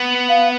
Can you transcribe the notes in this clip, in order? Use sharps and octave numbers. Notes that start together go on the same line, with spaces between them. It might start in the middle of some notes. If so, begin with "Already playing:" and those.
Already playing: B3
F5